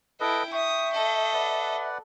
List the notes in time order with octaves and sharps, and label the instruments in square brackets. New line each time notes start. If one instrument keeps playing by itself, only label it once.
[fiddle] E4 G5 [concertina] A4 B4 D#5
[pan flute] E5 [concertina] G5 C#6 [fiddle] D#6
[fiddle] A4 D#5
[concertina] B4 D5 F#5